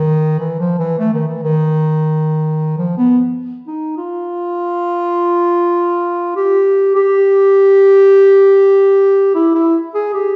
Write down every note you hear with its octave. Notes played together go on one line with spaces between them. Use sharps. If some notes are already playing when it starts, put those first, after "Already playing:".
Already playing: D#3
E3
F3
E3
A3
D#3
E3
D#3
F3
B3
D#4
F4
G4
G4
E4
E4
G#4
G4